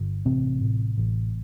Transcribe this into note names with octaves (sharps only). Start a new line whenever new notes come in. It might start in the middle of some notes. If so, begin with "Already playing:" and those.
Already playing: G1
A1 C3 C4
A2
A1